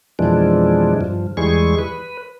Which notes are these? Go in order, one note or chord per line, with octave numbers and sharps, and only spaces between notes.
F2 B2 E3 F3 G#3 D4
G2 F3
E2 E3 G3 G#3 G#4 C#6
B4